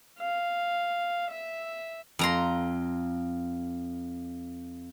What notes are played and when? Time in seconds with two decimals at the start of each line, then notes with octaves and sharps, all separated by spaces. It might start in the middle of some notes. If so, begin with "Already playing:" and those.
0.19 F5
1.31 E5
2.19 F2 A#5 C6